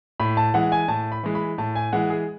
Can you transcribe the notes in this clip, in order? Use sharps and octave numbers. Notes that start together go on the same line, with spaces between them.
A2 B5
A5
E3 G#3 F#5
G#5
A2 A5
B5
E3 G#3
B5
A2 A5
G#5
E3 G#3 F#5
G#4